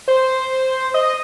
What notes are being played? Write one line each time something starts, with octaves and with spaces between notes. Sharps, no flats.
C5
D#5